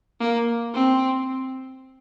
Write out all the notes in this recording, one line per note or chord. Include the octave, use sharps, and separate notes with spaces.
A#3
C4